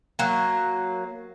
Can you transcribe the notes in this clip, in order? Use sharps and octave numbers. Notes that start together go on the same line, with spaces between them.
F#3 A#3